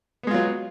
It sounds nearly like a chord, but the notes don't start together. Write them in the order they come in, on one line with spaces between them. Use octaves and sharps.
B3 G#3 F4 F#3